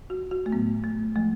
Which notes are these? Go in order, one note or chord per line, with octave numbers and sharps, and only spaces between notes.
F#4
F#4
A3
A2 F#3 B3
A3
F3 G#3 A3